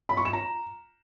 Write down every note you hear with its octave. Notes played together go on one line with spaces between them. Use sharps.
B5
C#6
E7
A#5